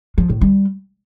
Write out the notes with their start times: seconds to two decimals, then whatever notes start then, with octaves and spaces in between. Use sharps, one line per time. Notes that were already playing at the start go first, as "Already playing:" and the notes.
0.18 F3
0.30 A2
0.41 G3